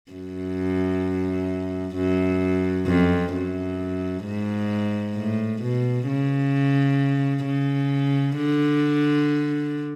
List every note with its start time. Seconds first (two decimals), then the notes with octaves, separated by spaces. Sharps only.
0.12 F#2
1.96 F#2
2.87 F2
3.33 F#2
4.25 G#2
5.16 A2
5.62 B2
6.08 C#3
7.46 C#3
8.37 D3